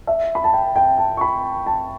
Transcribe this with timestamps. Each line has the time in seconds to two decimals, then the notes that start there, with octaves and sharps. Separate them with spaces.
0.07 E5
0.35 B5
0.44 A5
0.53 G5
0.76 G5
0.98 A5
1.17 C#6
1.21 B5
1.67 A5